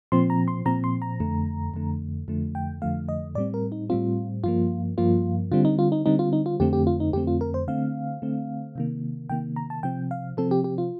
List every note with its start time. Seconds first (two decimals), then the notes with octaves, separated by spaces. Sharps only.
0.12 A#2 F3 C4 C6
0.30 A#5
0.48 C6
0.66 A#2 F3 C4 A#5
0.84 C6
1.02 A#5
1.20 F2 D3 A3
1.74 F2 D3 A3
2.28 F2 D3 F3 A3
2.55 G5
2.82 F2 D3 F3 A3 F5
3.09 D#5
3.35 A2 G3 C4 D5
3.54 A#4
3.72 D#4
3.89 A2 G3 C4 F4
4.44 G2 F3 A#3 F4
4.98 G2 F3 A#3 F4
5.52 D3 G3 C4 F4
5.65 D#4
5.79 F4
5.92 D#4
6.06 D3 G3 C4 D#4
6.19 F4
6.33 D#4
6.46 F4
6.60 F2 D3 A3 C4 G4
6.73 G4
6.87 F4
7.00 D#4
7.13 F2 D3 A3 C4 G4
7.27 F4
7.41 A#4
7.54 C5
7.67 D3 A3 C4 F5
8.22 D3 A3 C4
8.76 C3 D#3 A#3
9.30 C3 D#3 A#3 G5
9.56 A#5
9.70 A5
9.83 C3 F3 C4 G5
10.11 F5
10.37 C3 F3 C4 A4
10.51 G4
10.64 G4
10.78 F4